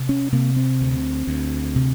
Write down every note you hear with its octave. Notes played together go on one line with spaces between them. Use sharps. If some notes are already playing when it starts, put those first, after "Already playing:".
Already playing: C3
C#4
C3 A#3
C4
D2
D2
C3